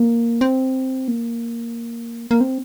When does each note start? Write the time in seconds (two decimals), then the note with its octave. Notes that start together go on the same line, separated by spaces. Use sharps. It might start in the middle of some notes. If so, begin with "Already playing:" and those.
Already playing: A#3
0.41 C4
1.08 A#3
2.31 A#3
2.41 C4